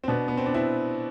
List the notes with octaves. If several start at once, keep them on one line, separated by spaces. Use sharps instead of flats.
C4
B2 B3 D4
B3
C4
D4
C4 E4